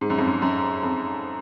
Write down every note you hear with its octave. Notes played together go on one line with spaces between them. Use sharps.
G#2
F#2
F2
F#2
F#2
F2